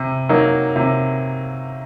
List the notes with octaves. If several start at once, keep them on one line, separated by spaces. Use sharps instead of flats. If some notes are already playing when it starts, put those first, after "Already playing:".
Already playing: C3
F#3 A#3 D#4
C3